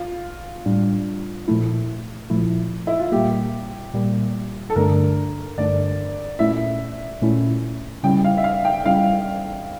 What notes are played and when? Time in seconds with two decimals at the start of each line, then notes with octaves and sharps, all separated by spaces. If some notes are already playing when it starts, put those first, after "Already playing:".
Already playing: F4
0.66 A2 G3 D4
1.48 A#2 F3 A3 E4
2.30 A#2 F3 A3 E4
2.87 E4
2.99 F4
3.12 A#2 G3 A#3 G4
3.94 A#2 G3 A#3
4.70 A4
4.76 G2 D3 A3 D4 A#4
5.58 G2 D3 A3 D4 D5
6.39 A#2 A3 C#4 E4 E5
7.22 A#2 A3 C#4 E4
8.03 C#3 G3 C#4 E4 G5
8.24 F5
8.38 E5
8.44 F5
8.65 G5
8.85 C#3 G3 C#4 E4 F5